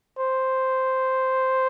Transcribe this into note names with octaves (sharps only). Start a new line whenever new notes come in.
C5